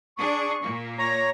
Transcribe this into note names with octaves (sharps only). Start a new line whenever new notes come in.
D4 G#4 C#6
A#2 A#3
C#5 A#5 A#6